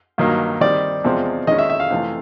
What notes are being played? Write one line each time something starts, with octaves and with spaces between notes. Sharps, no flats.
G2 D#3 F#3 A#3
D#3 G3 C4 D5
E2 C3 F3 G#3 C4
D#3 G#3 C#4 D#5
E5
E5
F5
F2 C3 E3 A3